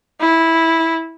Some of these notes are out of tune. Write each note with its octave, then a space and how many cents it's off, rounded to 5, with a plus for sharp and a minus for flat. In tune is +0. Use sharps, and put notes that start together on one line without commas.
E4 -10